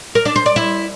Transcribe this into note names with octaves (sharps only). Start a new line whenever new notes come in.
A#4
D4
C5
D5
E4